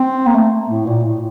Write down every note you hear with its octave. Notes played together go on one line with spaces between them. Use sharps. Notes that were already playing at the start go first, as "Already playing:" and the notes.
Already playing: C4
A#3
A3
A2
A#2
A2